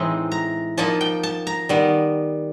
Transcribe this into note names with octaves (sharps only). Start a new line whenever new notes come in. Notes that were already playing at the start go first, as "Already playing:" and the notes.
Already playing: A2 E3 G#3 C4 D#4 G5
A#5
F3 A#3 D#4 A5
G5
A5
A#5
D#3 G3 B3